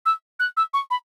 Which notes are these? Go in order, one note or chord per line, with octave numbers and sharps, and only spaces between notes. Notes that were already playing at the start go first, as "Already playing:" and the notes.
E6
F#6
E6
C#6
B5